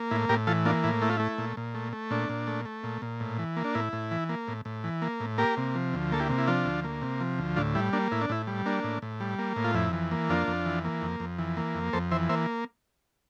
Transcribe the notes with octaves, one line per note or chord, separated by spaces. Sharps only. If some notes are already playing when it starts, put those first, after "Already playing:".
Already playing: A#3
A2 E4
A2 G4 A#4
E3 F4 A4
A#3 D4 F4
A2 E4
A3 E4
F4
A3 E4
A#2
A#2
A3
A3
A#2 D4
A#2
A3
A3
A#2
A#2
A2
E3
A#3
D4
A2 E4
A2
E3
A#3
A2
A2
E3
A#3
A2
A#3 G4 A#4
C3
F3
D2
A#3 A4
E4 G4
C3
E4
F3 D4 F4
D2
A#3
C3
F3
D2
A2 D4 F4
G3 E4
A#3 D4
A2 E4
D4
A2 E4
G3
A#3 D4
A2
A2
G3
A#3
A2
F4
F2 E4
E3
A#3
F2 D4 F4
F2
E3
A#3
F2
F2
E3
A#3
F2
F2 A4 C5
E3 C5 E5
A#3 C5 E5